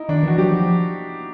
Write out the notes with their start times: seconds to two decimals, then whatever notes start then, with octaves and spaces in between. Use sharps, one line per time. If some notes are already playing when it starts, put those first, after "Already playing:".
Already playing: D#4 E4
0.09 D#3 D4
0.23 E3 F#4
0.38 F#3 G4
0.53 F3